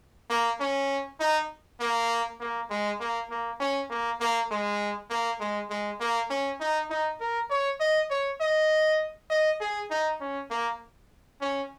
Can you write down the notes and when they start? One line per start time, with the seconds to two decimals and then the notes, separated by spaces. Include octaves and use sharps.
0.30 A#3
0.60 C#4
1.20 D#4
1.80 A#3
2.40 A#3
2.70 G#3
3.00 A#3
3.30 A#3
3.60 C#4
3.90 A#3
4.20 A#3
4.50 G#3
5.10 A#3
5.40 G#3
5.70 G#3
6.00 A#3
6.30 C#4
6.60 D#4
6.90 D#4
7.20 A#4
7.50 C#5
7.80 D#5
8.10 C#5
8.40 D#5
9.30 D#5
9.60 G#4
9.90 D#4
10.21 C#4
10.50 A#3
11.41 C#4